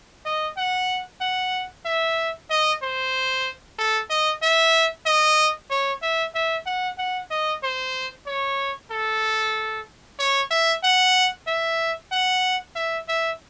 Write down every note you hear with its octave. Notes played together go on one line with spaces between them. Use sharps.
D#5
F#5
F#5
E5
D#5
C5
A4
D#5
E5
D#5
C#5
E5
E5
F#5
F#5
D#5
C5
C#5
A4
C#5
E5
F#5
E5
F#5
E5
E5